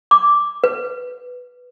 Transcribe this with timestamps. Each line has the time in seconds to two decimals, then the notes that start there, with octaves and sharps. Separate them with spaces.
0.11 D6
0.64 B4